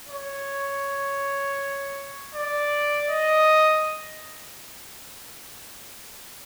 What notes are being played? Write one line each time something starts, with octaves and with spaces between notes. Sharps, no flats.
C#5
D5
D#5